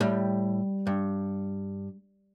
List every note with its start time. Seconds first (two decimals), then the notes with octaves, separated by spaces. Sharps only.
0.01 A2 G3
0.87 G2